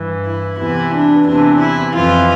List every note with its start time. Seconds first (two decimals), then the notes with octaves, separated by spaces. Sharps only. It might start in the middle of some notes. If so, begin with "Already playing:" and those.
Already playing: G2 E3
0.26 E4
0.59 E2 C3 E3 E4
0.94 D4
1.27 E2 C3 E3 D4
1.61 E4
1.95 F2 E3 F4